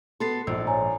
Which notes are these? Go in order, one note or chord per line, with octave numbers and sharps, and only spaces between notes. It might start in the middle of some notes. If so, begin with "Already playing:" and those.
B3 F#4 A4 C6 A6 C7
A#1 G#2 E6
C#5 G#5 A#5